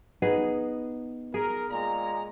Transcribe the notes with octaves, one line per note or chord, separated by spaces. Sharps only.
B3 D#4 G#4
G#4 A#4
A#2 G#3 A#5